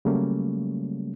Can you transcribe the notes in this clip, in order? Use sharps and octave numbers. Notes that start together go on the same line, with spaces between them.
C#3 F#3 G3 A3 A#3 C#4